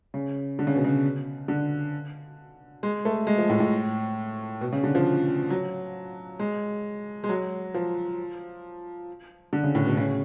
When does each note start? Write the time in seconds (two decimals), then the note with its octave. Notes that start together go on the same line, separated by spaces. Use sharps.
0.14 C#3
0.59 D3
0.67 C#3
0.76 B2
0.84 C#3
1.48 D3
2.83 G#3
3.05 A3
3.27 G#3
3.38 F3
3.50 A2
3.60 A2
4.61 B2
4.73 C#3
4.84 D3
4.95 F3
5.50 F#3
6.40 G#3
7.24 G#3
7.29 F#3
7.74 F3
9.53 D3
9.63 C#3
9.75 A2
9.86 B2
9.97 C#3